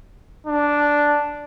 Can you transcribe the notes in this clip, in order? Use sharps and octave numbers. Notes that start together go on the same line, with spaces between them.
D4